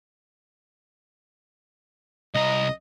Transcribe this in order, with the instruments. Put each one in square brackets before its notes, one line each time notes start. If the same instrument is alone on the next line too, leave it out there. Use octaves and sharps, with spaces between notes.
[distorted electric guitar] C2 A#5 [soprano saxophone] D#5